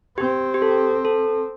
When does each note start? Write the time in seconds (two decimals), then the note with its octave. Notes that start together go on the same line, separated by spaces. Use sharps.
0.18 C4 G4
0.54 G4
0.62 A4
1.05 A4